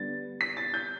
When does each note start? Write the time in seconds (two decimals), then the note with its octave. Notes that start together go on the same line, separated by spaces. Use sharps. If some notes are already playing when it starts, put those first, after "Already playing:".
Already playing: D3 G3 B3 A6
0.41 B6
0.57 A6
0.74 G6